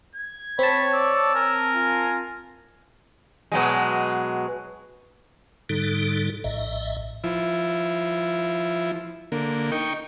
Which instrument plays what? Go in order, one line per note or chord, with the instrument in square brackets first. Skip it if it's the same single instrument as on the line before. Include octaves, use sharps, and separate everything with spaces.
[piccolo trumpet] G#6
[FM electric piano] C4 A5 [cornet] C#5 [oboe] B5
[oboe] D5 [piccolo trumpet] E6
[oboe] A#4 [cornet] G#5
[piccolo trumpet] F4
[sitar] B2 F#3 G#3
[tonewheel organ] G#2 D3 G3 D#4 A4
A#1 A2 D#5 E5
[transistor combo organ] F3 E4
D3 A#3
D#4 G5 C#6